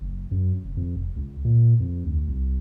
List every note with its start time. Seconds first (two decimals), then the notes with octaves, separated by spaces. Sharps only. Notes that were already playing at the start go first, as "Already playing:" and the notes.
0.01 F#1
0.31 F#2
0.64 F1
0.77 F2
0.96 F1
1.16 C#2
1.45 A#2
1.80 F2
2.05 D2
2.27 C2